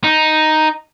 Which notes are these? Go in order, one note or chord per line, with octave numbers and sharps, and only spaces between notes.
D#4